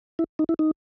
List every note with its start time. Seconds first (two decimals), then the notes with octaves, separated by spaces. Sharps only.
0.19 E4
0.39 D#4
0.49 E4
0.59 D#4